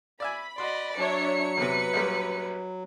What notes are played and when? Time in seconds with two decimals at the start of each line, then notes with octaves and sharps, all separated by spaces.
0.20 D5 E5 G#5 B5
0.58 F#4 D5 D#5 C6
0.98 F#3 D4 C#5 E5 C#7
1.57 E2 C3 B4
1.93 A#1 F#2 G3